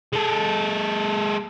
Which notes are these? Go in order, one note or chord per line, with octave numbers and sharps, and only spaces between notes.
G#3 A4